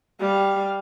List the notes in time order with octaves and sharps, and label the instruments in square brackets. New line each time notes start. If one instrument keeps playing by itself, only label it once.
[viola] G3 F5